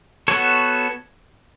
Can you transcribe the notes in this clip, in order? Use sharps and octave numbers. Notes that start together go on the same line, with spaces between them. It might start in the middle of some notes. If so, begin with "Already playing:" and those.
B3 F#4 A4 C#5